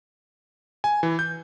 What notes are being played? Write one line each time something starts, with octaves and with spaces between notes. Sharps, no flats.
G#5
E3
G6